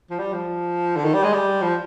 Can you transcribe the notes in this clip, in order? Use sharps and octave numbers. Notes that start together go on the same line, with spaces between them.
F3
G3
F3
D3
D#3
G3
G#3
G3
F3